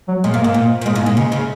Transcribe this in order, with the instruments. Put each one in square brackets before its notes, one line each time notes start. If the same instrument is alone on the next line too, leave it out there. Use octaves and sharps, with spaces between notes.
[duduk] F#3
[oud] A#2 [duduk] G#3
[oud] G#2 [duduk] A#3
[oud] G#2 [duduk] A#3
[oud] A#2
A#2
[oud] G#2 [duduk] G#3
[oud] G#2 [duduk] A#3
[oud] A#2 [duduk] G#3
[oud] C#3
C#3